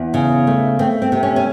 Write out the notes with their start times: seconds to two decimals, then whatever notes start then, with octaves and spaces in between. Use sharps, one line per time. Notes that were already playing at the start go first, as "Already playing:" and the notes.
Already playing: E2
0.14 C#3
0.47 A3
0.79 A3 C4
1.02 C4
1.12 C3
1.23 C#4
1.36 C#4